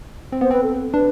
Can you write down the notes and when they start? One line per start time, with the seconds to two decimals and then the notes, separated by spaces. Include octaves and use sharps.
0.32 C4
0.41 B3 C5
0.51 C4 B4
0.63 A4
0.93 D4 B4